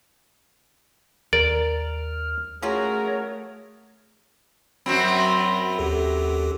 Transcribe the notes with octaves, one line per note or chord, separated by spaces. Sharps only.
D#2 A#4 D5 F6
A3 C#4 F4 F#4 G#4 A#4 C#5
F#2 F#3 C4 B5
D#2 G4 A4